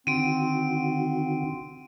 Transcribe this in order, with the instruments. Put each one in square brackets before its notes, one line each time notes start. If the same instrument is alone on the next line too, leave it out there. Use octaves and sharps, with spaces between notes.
[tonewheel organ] D3 D#3 F#4 [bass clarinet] C4 [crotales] D7 D#7